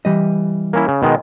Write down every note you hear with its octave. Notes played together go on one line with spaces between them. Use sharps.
E3 G3 D#5
A#3 C#4 E4
C#3
B2 D#3 G#3